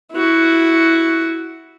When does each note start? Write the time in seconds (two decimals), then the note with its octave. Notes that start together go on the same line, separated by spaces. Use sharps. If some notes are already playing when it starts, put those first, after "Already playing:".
0.12 E4 F#4